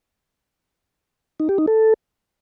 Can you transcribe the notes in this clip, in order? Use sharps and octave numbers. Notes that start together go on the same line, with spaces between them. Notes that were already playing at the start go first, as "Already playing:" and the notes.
D#4
G4
D#4
A4